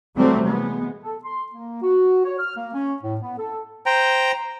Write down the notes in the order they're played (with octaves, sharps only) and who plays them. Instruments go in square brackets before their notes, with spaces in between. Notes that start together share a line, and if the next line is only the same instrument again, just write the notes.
[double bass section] C3 E3 F#3 G3 A3 C4
G#3 B3
[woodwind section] A4
C6
A#3
F#4
C#5
F6
A#3
C#4
A2
B3
A4
[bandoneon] C5 G5 A#5